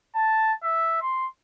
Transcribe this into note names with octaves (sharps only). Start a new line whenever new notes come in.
A5
E5
C6